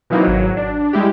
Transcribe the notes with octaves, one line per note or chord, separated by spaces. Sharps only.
B2 E3 F#3 A#3 C4 D#4
G#1 F#3
D4
G3 G#3 E4 G4